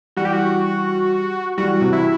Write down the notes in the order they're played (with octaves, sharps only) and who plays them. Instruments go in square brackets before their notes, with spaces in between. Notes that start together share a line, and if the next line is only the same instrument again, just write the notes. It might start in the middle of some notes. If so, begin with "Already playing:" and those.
[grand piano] E3 G3 [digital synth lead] F#4
[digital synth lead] G4
F#4
[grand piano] E3 G3 [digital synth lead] F#4
[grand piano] C3 E3
[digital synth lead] E4